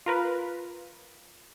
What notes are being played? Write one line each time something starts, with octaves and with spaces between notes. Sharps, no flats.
F4 A#4 B4